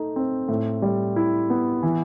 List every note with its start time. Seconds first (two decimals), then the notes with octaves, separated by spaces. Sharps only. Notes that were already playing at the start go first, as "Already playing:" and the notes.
Already playing: A3 D#4
0.16 C4
0.48 A2
0.82 G3
1.16 E4
1.50 B3
1.83 E3